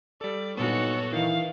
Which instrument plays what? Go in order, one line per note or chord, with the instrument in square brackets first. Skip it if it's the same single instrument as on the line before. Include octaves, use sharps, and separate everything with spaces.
[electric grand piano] G3 A4 [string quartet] D5
[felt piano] G2 A#2 F#3 [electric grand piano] B3 [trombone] D#4 [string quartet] F#4 A4 C#5
[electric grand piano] D#3 [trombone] E3 [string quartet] F5